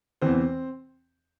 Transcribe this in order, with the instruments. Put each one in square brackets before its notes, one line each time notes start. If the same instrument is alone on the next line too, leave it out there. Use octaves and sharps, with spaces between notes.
[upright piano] E2 C3 E3 C4 C5